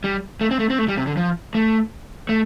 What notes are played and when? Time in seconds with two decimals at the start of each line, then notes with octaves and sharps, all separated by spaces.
0.04 G3
0.41 A3
0.51 C4
0.60 A3
0.70 C4
0.79 A3
0.89 G3
0.98 C3
1.07 D3
1.17 F3
1.55 A3
2.29 A3